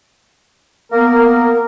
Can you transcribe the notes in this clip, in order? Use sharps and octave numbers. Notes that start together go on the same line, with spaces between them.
A#3 B3 A#4